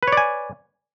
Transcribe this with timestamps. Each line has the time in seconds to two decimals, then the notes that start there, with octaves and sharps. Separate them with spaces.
0.03 B4
0.08 C#5
0.12 D5
0.17 G#5